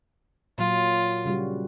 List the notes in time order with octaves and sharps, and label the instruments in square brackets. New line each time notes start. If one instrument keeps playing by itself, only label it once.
[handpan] A#2 F#3 [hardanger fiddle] F4
[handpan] C#3 G3 F#4